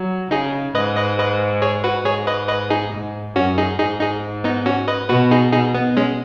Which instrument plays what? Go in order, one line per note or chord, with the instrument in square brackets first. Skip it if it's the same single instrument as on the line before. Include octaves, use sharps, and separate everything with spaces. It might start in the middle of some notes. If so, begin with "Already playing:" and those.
Already playing: [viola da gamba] F#3
[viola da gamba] C#3 [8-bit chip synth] D#4 G#4
[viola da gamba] G#2 [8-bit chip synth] B4 D#5
[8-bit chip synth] B4 D#5
B4 D#5
G#4 C#5
F#4 B4
[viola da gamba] G#2 [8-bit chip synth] G#4 C#5
[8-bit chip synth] B4 D#5
B4 D#5
D#4 G#4
[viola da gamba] G#2
[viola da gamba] F#2 [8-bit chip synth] C#4 F#4
[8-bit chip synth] D#4 G#4
[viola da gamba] G#2 [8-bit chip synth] D#4 G#4
[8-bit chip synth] D#4 G#4
B3 D#4
C#4 F#4
B4 D#5
[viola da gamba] B2 [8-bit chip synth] F#4 B4
[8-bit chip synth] D#4 G#4
[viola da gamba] B2 [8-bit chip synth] D#4 G#4
[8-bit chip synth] B3
G#3 C#4